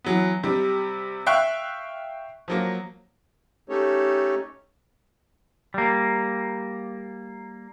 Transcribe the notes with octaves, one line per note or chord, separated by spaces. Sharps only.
E3 F#3 B3
C3 G3
E5 F5 G5 C#6 F#6
F3 F#3 A#3
A3 C#4 D#4 G4 A4 C#5
G3 A#3